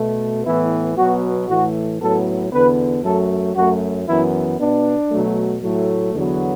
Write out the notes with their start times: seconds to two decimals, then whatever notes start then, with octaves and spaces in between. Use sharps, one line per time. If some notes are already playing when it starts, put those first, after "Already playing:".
Already playing: B2 A3
0.44 A2 E3 B3 E4
0.96 B2 F#3 B3 F#4
1.48 A2 E3 A3 F#4
2.00 A2 F#3 B3 A4
2.51 E2 D3 B3 B4
3.03 F#2 F#3 A3 A4
3.55 F#2 F#3 A3 F#4
4.07 F#2 E3 B3 E4
4.58 B2 B3 D4
5.10 B2 F#3 A3
5.62 A2 F#3 A3
6.14 E2 D3 F#3 B3